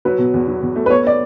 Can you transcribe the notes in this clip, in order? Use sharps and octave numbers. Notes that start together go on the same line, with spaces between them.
F#3 B4
B2
E2
F#3
E2
A3
B4
B3 C#5
B3 D5